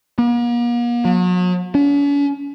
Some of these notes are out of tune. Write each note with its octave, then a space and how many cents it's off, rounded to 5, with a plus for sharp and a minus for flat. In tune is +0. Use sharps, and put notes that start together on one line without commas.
A#3 +45
F#3 -40
C#4 +45